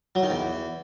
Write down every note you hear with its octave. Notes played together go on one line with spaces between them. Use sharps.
F#3
D#3
E2